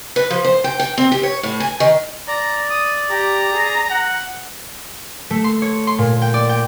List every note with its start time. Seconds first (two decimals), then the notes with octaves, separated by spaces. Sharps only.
0.16 B4
0.30 F3
0.44 C5
0.64 G5
0.80 G5
0.98 C4
1.12 G4
1.23 C#5
1.43 A2
1.60 G#5
1.80 D#3
2.28 D5 A#5
2.70 D#6
3.10 G4 A#5
3.52 G#4
3.90 F#5
5.30 A3
5.44 C6
5.62 C#5
5.87 C6
5.98 A#2
6.22 G5
6.34 D5
6.49 G5